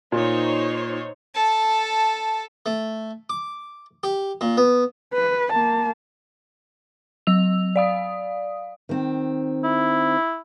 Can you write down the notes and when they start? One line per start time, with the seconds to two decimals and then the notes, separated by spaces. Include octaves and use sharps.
0.12 A#2 D#4 C5 C#5
1.35 A4 A5
2.66 A3
3.30 D6
4.03 G4
4.41 A#2
4.57 B3
5.14 B4
5.52 A#3 A5
7.27 F#3 E6 F7
7.76 D5 F5 D#6
8.89 D#3 C4
9.64 E4